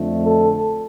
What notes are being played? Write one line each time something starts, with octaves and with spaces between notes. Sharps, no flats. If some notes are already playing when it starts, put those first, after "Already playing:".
Already playing: F2 D3 A3
A4